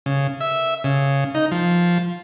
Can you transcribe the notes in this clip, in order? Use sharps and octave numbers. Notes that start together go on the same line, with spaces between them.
C#3
E5
C#3
D#4
F3